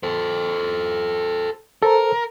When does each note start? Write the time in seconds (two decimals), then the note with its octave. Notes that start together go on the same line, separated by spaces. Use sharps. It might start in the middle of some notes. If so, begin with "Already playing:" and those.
0.03 A4 C5
1.82 A4 A#4 C5 A#5